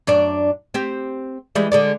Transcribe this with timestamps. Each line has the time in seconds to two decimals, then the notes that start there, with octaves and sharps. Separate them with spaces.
0.07 F#2 D4 D5
0.74 C4 G4
1.55 E3 G3 G#3
1.72 D3 G#3 D5